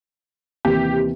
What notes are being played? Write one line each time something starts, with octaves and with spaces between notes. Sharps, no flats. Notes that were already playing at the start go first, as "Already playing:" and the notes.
D#2 C3 E3 G4